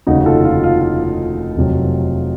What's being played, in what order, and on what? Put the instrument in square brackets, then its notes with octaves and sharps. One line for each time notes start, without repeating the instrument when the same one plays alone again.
[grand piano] F1 D#2 C#3 D#4 F#4
F4 A4
F4
F4
F4
F1 F2 C3 F#3